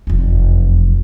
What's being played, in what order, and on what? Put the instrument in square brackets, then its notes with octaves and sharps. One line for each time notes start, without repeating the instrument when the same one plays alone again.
[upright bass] F1 E2